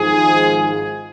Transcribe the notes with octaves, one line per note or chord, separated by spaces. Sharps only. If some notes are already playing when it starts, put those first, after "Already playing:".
Already playing: G#1 G#2 F3 G#3 G#4